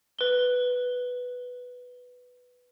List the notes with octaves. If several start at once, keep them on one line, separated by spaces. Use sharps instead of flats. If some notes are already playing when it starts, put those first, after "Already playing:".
B4 G7